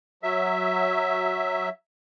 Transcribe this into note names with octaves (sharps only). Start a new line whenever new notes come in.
F#3 E5